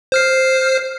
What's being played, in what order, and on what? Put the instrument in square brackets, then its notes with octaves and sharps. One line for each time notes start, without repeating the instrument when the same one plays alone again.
[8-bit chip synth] C5 F6 C7